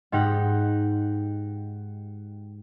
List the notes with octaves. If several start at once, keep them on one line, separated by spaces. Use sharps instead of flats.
G#2 D#4 G4 F#5